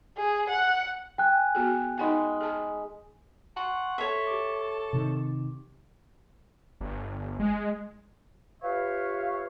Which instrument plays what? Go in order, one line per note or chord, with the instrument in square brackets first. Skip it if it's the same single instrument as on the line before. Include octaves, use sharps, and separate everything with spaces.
[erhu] G#4
F#5
[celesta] G5 F#6 [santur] G#5
[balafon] B3 F#4 G#4
[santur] G#3 B5 D6 [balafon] D#4 F#5 G#5
[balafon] G#4 A5
[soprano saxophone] F#5 [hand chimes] A5 C6 C#6
[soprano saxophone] A4 [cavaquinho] C#5 E5
[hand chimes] G4 D6
[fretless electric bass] C3 D#3
[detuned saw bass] G1
G#3
[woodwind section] F4 G4 B4 C#5 E5 F5